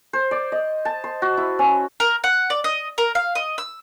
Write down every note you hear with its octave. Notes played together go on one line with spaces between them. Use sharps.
C5
D5
D#5
A5
C6
F#4
E4
C#4
A#4
F#5
D5
D#5
A#4
F5
D#5
E6